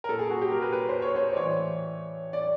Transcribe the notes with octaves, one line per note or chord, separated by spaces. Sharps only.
A#4
A#2 A4
G#4
F#4
G4
A#4
B4
B4
C5
C#5
C5
D5
A2 E3 C#5
D5